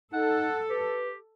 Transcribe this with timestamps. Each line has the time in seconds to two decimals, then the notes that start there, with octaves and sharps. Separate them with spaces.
0.13 D#4 A4 F#5
0.70 G4 B4